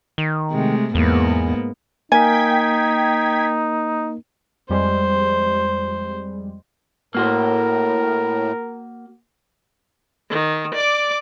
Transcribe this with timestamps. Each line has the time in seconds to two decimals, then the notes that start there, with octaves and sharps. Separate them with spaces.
0.18 D#3
0.51 C3 G#3 A3
0.95 E2 G#2 A#3 B3
2.12 A#3 D#4 A#4 G5 G#5 G#6 B6
4.69 F2 G3 G#3 C5
7.15 A2 A#3 F#4 A#4 C5
10.30 D#3
10.75 D5 D6